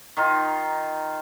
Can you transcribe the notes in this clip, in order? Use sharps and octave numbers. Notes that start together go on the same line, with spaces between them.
D#3 D#4 F4